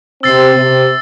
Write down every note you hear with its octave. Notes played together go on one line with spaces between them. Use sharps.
C3 C4 E6 A6 C7
C3 C4